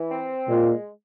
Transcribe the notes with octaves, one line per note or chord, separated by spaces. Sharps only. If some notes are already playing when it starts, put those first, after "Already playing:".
Already playing: E3
C4
A#2 G#3